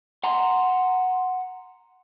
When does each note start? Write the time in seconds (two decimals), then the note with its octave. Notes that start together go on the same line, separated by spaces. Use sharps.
0.24 F#5 G#5 A#5 C6